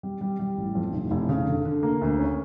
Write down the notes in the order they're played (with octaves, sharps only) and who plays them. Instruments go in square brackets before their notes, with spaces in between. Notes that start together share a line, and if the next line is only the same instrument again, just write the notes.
[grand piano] G3
G3
G3
A1
F2
F1
F1
C#3
D3
D3
A#3
D2
C#4